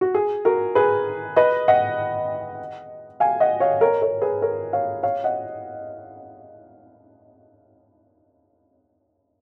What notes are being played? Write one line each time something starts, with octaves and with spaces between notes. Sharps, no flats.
F#4
G#4
F#4 A#4
G#4 B4
B4 D#5
D#5 F#5
F5 G#5
D#5 F#5
C#5 F5
A#4 C#5
A#4 C#5
G#4 B4
A#4 C#5
C#5 F5
C#5 F5
D#5 F#5